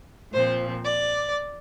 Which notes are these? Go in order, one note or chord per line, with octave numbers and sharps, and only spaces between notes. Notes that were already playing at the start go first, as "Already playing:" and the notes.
A#2 F3 C4 C5
D5